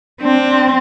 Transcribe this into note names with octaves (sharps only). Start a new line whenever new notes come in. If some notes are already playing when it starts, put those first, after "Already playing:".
C4 D4